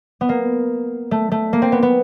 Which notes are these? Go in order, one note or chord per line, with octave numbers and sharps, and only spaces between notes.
B3
A#3
A3
A3
A#3
C4
B3
B3